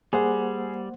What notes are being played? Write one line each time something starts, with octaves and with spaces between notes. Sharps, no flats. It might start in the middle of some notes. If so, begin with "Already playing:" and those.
G3 A#3 G#4 C5 F#5